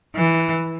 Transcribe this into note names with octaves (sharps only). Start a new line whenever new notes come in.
E3